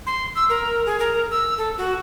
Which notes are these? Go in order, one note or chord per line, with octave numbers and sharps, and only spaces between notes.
C6
E6
A#4
G#4
A#4
E6
A4
F#4